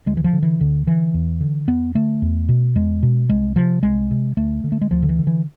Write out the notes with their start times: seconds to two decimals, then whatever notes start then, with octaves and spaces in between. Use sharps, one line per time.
0.06 D2 G#3
0.17 E3
0.24 F3
0.33 D3
0.43 E3
0.60 D2 D3
0.87 D3 E3
1.14 E2
1.41 D3
1.67 E2 B3
1.95 D3 A3
2.22 E2
2.49 B2
2.75 E2 G#3
3.03 B2
3.29 C2 G#3
3.56 C3 F3
3.83 C2 G#3
4.11 C3
4.37 D2 A3
4.64 D3
4.72 A3
4.81 G#3
4.91 D2 F3
5.02 D3
5.09 E3
5.18 D3
5.27 E3